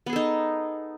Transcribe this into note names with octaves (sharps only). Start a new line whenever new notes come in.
B3 D#4 G#4 A4